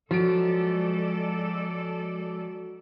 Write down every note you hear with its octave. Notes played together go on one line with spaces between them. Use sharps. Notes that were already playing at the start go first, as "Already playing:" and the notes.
F3 F#3 G#3 A4 D5 D7